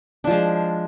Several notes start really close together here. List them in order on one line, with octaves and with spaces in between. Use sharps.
D4 F3 G#3